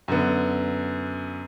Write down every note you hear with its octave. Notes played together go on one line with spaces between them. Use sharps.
F#2 D3 B3